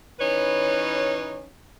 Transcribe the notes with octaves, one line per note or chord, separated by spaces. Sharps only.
E3 C#4 D#4 B4 C#5